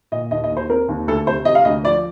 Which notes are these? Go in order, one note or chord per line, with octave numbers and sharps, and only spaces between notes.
A#2 D#5
D#2 D#5
D#5
D#2
C5
C4 A#4
D#2
D2 A4
C3 C5
C3 D#5
F5
D2 D#5
F3 D5